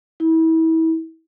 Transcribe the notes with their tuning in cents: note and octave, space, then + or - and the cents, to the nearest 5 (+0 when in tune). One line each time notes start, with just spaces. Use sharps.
E4 -30